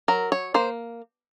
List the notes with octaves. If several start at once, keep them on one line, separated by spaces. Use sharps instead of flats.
F#3 A#4
C#5
A#3 C5